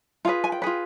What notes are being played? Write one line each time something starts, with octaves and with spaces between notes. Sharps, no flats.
F4 G#4 B4 F5
G#5
G5
F4 G#4 B4